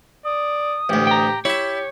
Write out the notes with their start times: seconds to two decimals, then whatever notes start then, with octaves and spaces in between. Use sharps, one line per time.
0.25 D5 D#6
0.89 A1 D2 G4
1.07 G5 A#5
1.45 E4 G4 C#5 E5